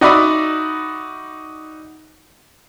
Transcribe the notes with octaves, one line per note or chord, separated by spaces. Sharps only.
D#4 F#4 D5 E5 B5 D#6